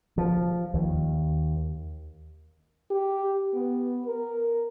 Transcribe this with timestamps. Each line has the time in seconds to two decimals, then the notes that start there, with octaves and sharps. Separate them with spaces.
0.18 F3
0.74 D#2
2.90 G4
3.54 B3
4.06 A#4